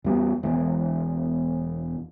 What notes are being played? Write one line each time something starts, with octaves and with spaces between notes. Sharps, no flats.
E2 G3 B3
E1 E2 E3